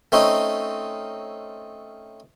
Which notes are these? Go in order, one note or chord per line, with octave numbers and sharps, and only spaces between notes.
A3 C4 C#4 D#4